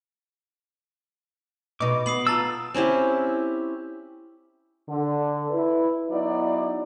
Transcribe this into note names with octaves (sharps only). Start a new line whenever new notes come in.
B2 D#4 D6
B3 D#6 C7 F#7
F4 A5 A#5 E6 A6
C4 C#4 E4 G4
D3
E4 B4
F#3 B3 D#4 E4 D5